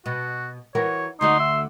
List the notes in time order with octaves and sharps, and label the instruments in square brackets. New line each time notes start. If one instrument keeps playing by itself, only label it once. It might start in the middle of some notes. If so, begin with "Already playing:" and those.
[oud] B2 [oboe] F#4
[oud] E3 F#4 A#4 [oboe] C#5
[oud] D2 D3 F#4 [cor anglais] D#4 [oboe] C6
[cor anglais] E5